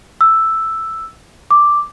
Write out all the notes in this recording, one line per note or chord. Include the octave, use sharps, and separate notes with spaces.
E6
D6